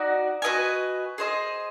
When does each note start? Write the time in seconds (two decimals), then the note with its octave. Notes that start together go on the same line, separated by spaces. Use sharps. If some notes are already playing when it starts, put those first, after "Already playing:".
Already playing: D#4 F#4 D5
0.42 F#4 B4 D#5 G#5
1.18 G#4 C5 D#5